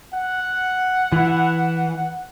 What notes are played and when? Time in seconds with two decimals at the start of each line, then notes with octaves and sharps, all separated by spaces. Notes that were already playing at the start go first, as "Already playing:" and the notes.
0.14 F#5
1.12 E3